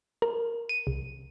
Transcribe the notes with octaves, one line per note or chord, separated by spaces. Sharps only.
A#4
D#7
C2